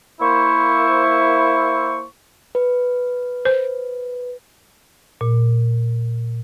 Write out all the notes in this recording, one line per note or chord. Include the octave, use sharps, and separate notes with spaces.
A#3 E4 C5 C#6
B4
C5
A#2